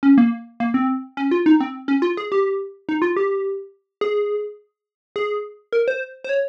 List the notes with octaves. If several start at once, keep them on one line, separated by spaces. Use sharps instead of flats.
C#4
A#3
A#3
C4
C#4
F4
D#4
C4
C#4
F4
G#4
G4
D#4
F4
G4
G#4
G#4
A#4
C5
C5
C#5